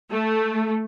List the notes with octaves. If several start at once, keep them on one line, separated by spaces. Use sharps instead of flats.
A3